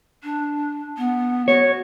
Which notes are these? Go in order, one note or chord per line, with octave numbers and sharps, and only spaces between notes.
D4
B3
F#4 C#5